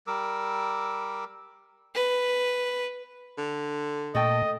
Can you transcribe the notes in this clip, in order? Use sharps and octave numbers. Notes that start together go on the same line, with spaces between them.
G3 A#4 D6 E6
B4
D3
A#2 A3 A4 D#5 G5